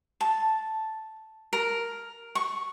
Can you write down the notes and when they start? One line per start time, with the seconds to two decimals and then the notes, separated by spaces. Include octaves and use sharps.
0.21 A5
1.53 A#4
2.35 C#6